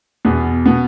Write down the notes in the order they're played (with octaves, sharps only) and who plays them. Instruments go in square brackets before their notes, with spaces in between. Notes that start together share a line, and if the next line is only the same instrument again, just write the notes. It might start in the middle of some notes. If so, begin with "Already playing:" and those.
[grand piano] E2 B2 B3
B2 B3